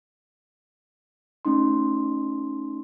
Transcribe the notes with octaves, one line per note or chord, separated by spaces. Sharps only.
A3 C#4 D#4 C6